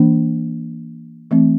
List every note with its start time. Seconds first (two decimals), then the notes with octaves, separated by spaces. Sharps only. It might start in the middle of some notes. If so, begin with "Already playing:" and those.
Already playing: E3 A#3 D4
1.31 E3 A3 C4